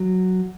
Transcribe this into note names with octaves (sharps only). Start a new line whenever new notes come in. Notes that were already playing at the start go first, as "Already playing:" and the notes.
Already playing: F#3